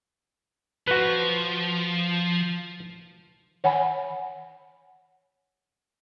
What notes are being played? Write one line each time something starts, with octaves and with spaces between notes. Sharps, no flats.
F3 F#4 B4
C#5 F#5 G#5 B5